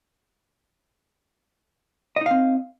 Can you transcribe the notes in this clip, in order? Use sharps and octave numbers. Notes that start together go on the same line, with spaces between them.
C4 D#4 D#5 F5